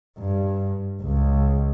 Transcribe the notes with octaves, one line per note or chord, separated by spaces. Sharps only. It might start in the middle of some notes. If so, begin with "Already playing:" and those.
G2
C#2